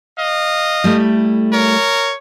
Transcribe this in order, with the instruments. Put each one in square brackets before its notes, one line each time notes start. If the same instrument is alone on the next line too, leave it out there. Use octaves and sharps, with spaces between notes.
[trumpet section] D#5 F5
[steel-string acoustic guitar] G3 A3 E4
[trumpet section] A#4 C#5